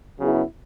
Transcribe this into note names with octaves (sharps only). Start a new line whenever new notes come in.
C#3 F#3 B3 E4 G#4